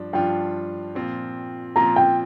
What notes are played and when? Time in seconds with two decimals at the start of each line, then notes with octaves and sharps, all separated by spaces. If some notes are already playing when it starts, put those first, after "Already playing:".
Already playing: G2 F3 D4
0.13 G2 F3 D4 F4 G5
0.95 A#2 F3 C4 F4
1.76 A#2 F3 C4 F4 A#5
1.96 G5